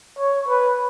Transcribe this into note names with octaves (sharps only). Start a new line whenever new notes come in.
C#5
B4